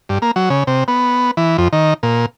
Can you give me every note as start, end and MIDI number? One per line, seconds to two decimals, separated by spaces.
0.09 0.18 43
0.22 0.31 58
0.36 0.49 54
0.50 0.64 49
0.67 0.84 48
0.88 1.31 59
1.37 1.57 52
1.58 1.68 41
1.73 1.94 51
2.03 2.26 46